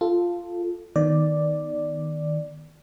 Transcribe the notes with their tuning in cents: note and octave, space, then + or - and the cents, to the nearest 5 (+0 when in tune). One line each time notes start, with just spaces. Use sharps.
F4 +0 A4 +0
D#3 +0 B3 -15 D5 +0